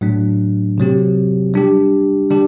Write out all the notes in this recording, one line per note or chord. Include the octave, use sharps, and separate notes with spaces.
A2 F#3 A3 D4
C3 F#3 C4 G4
G3 D4 G4
D3 G3 D4 G4